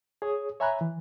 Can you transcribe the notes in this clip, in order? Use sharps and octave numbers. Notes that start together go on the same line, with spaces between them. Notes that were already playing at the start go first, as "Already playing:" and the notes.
G#4 C#5 D#6
C#5 E5 G#5 A#5 B5 F#6
E3